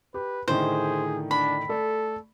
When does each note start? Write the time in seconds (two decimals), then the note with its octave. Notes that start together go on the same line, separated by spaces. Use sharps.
0.14 G4 B4
0.48 A2 D3 D#3 G#4 C5
1.31 D4 B5
1.69 A3 A4 D5